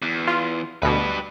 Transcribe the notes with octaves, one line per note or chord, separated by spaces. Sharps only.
E2
F4
D2 B2 G3 B4